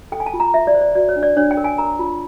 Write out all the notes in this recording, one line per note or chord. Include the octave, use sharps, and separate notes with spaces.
A4 G5
G#5
A5
F4
A#5
F4 E5
D5
C5
D5
F#4 D5
C#5
D4
D5
D4 C#5
G5
A#4
G#5
A#4 A#5
F4